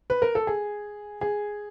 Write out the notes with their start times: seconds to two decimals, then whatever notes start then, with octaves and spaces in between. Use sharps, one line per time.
0.10 B4
0.22 A#4
0.35 A4
0.47 G#4
1.21 G#4